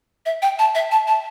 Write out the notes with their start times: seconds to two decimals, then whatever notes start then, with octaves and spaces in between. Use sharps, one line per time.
0.26 E5
0.42 G5
0.59 A5
0.75 E5
0.91 A5
1.07 A5